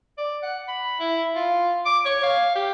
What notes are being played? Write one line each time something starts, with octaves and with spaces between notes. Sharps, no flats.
D5
F#5
B5
E4
F4
D6
C#5
F5
G4